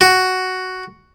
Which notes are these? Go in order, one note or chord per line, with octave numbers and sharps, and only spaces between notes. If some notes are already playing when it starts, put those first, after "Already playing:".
F#4